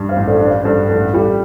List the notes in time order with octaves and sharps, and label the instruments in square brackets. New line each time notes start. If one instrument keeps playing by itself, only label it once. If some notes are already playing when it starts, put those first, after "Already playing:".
Already playing: [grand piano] G2
[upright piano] C5 F5
[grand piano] A1
[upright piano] A4 D5
[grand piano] D4
[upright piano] C5 F5
[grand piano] G2 [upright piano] A4 D5
[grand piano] A1 [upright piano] A4 D5
[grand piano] G3 [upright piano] F4 A4